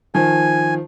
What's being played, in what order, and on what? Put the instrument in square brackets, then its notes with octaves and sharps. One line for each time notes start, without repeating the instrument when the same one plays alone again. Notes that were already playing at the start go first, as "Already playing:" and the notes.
[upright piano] D#3 F3 [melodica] G#5